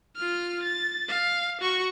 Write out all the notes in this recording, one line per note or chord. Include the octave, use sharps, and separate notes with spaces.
F4 F6
A6
F5
F#4 C#6